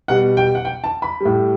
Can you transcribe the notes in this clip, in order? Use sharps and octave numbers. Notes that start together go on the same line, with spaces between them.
B2 G3 F#5
G5
F#5
G5
A5
B5
A2 G3